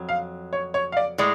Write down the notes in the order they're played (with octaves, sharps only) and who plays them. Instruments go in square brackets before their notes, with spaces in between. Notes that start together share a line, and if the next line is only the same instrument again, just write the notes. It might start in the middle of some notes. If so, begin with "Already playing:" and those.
Already playing: [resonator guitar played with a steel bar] F2 F#3
[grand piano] F5
C#5
C#5
F5
D5
[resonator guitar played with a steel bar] A2 G#3 [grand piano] D5